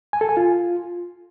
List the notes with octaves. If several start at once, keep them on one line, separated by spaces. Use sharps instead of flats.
G#5
A4
G#5
F4